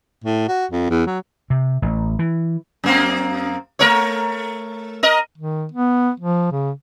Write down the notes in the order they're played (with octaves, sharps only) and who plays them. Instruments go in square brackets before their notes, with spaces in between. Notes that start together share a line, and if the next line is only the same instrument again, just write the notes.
[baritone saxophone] A2
F#4
F2
E2
F#3
[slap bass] C3
A1
E3
[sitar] F#2 A#3 C4
A3 A#4 C#5
A#4 D#5
[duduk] D#3
B3
F3
C#3